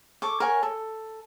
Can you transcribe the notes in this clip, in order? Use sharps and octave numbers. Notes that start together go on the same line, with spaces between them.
A4 C#6 D6
A#4 C#5 F#5 G#5
A4